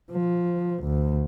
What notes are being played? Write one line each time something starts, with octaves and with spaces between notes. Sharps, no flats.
F3
D2